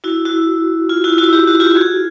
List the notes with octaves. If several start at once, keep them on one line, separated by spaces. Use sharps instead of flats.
E4 F#4
E4 F#4
F4
E4 F#4
E4 F#4
G4
F#4
F4 G4
F#4 G#4